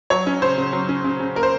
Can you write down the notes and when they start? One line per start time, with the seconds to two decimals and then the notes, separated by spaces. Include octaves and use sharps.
0.10 F#3 C#5
0.27 C#4
0.42 C#3 C5
0.58 C#3
0.73 F#3
0.89 C#4
1.04 C#3
1.20 C#3
1.36 A#3 A#4
1.43 C5